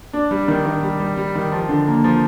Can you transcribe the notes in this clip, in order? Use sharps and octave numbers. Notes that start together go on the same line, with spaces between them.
D4
G3
D#3
D#3
G3
G3
G3
D#3
F3
D3
A#3
F3